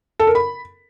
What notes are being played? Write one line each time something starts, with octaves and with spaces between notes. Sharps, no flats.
A4
A#4
B5